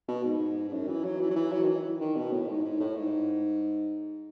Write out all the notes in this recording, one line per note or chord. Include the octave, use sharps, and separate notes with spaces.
B2
G#2
G#2
F#2
E3
F#3
E3
F#3
E3
F#3
D#3
E3
D#3
B2
A2
G#2
G#2
A2
G#2